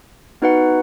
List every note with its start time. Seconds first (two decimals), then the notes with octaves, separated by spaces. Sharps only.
0.42 B3 D#4 F#4 B4 F#5